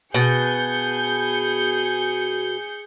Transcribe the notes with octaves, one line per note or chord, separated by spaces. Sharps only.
B2 G#4 G6 C#7